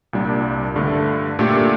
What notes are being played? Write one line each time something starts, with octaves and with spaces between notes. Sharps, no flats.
C2 A#2 G3 D4
G2 D3 A3
A#2 A3 D4 G4